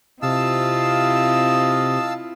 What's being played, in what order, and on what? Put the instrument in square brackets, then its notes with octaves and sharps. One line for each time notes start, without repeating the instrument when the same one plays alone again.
[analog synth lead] C3 [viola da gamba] C4 E4 F4 [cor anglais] D#5 [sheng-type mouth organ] F5 A5 E6